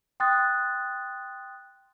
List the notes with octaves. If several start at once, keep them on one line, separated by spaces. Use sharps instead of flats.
G5 C6 D#6 F#6 A6